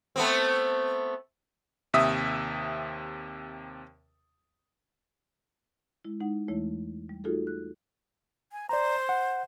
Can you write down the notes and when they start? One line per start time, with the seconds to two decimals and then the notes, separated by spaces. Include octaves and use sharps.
0.16 A3 B3 C4
1.94 D#2 C3 E5 D#6
6.05 G#3 E4
6.20 G#3 D#4 F#5
6.48 E2 E3 G#3 A3 E4 C#5
7.09 G3
7.24 A3 D#4 F4 F#4 G#4 A4
7.47 F#6
8.52 G#5
8.69 C5 D5 A#5
9.09 F#5